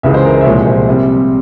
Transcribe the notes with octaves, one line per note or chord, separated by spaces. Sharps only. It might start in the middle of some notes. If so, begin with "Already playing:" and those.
C#2 C#3 E3 G#3 E5
C5
A#4
A#4
E5
C2 A#2 F3 G#3 C#5
C5
C3 G3 C4